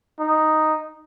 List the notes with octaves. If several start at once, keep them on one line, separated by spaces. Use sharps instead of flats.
D#4